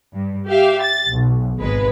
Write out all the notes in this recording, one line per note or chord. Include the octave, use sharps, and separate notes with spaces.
G2
G4 E5 F5
A6
B1
G#1 G#3 B4